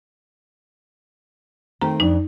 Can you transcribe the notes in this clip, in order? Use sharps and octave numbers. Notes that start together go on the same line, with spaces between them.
D#3 A3 C4 A#5
F2 D4 D#4